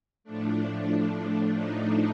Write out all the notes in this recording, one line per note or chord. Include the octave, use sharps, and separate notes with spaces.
A2 F3 A3 D4
D#4